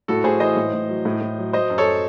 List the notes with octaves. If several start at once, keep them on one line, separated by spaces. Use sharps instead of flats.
A2 F#4 A4
A2 G#4 C5
E3 C5 D#5
A2
A2
F#3
A2
A2
F#3
F#3 C5 D#5
F#2
A4 C#5